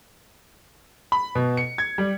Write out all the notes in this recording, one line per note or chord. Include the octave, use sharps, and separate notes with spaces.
B5
B2
C#7
G#6
G3